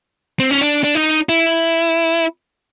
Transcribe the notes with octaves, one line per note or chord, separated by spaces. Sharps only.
C4
C#4
D4
D4
D#4
E4